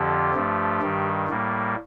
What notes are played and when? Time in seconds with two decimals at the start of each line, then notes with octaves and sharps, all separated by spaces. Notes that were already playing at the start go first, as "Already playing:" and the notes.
Already playing: F2 D3 F3 G4
0.35 G2 F3 A3
0.81 G2 D#3 G3
1.28 A2 G3 A#3